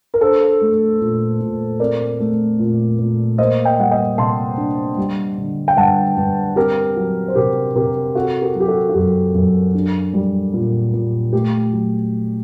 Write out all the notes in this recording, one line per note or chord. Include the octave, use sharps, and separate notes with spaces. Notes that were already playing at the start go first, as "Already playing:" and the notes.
A#4
D4 A4 C5
A3
A#2
A#2
C4 A#4 D5
A3
A#2
A#2
A#3 C5 D#5
D#5 G5
G3 F#5
D#5 G5
C3 A5 C6
D4
G3
D3
G5
G2 F#5 A5
G2
C4 G4 A#4
F#3
C5
C3 G4 A#4
C3 G4 A#4
C4 F#4 A4
G4 A#4
F#3
G4
F#4 A4
F#4
F#2 G4
F#2
D4
G3
A#2
A#2
A3 G4
F#3